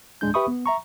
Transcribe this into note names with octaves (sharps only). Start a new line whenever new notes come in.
D2 A2 G#3 D4 G6
G4 B4 E5 B5 C#6 D#6
B3
E5 A#5 C#6